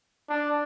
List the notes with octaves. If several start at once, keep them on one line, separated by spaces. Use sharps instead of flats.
D4